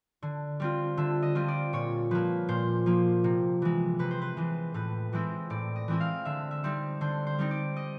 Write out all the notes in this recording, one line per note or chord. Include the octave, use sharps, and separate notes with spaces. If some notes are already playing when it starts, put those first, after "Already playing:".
D3
G3 C4 F4
D3 E5
D#5
G3 C4 F4
D5
A#2 C#5
F3 A#3 B4
A#2 C5
F3 A#3
C3
E3 G#3
C3 B4
C5
B4
E3 G#3
A2 B4
E3 G#3 C4 E4
A2 D5
D#5
E3 G#3 C4 E4
F5
D3 E5
E5
G3 C4 D#4
D3 C5
C5
G3 C4 D#4
D5
D#5